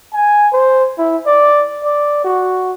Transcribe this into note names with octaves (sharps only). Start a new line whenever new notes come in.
G#5
C5
E4
D5
D5
F#4